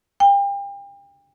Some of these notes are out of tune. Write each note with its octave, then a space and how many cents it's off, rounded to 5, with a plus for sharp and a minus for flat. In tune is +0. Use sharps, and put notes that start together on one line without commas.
G5 +35